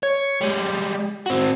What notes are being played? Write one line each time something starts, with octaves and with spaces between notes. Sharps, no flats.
C#5
G3 G#3
C4 F#4